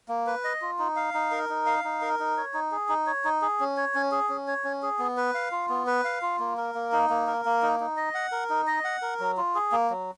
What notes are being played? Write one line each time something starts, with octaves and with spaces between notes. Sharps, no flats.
A#3
B4
D#5
F4
D#4
F5
D#4
A#4
D#4
F5
D#4
A#4
D#4
C#5
D#4
G#4
D#4
C#5
D#4
G#4
C#4
C#5
C#4
G#4
C#4
C#5
C#4
G#4
B3
B4
F5
F4
B3
B4
F5
F4
A#3
A#4
A#3
D#4
A#3
A#4
A#3
D#4
D#4
D#5
F#5
A#4
D#4
D#5
F#5
A#4
F#3
F4
G#4
A#3
F#3